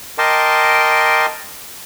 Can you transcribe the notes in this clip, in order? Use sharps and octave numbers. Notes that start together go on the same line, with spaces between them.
A#4 D#5 G5 A5 C6 D6